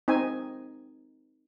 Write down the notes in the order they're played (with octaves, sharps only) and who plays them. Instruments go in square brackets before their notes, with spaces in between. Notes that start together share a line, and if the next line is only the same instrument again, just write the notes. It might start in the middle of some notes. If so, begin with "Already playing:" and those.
[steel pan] C4 D#4 G#5